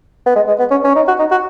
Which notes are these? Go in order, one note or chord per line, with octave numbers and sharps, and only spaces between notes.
B3
G#3
G#3
B3
C#4
C#4
D#4
F#4
D#4
F#4